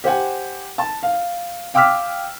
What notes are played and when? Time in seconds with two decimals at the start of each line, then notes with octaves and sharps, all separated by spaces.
0.04 G4 C5 F#5 G#5
0.78 A5
1.03 F5
1.74 F5 G5 D6 E6 F6 B6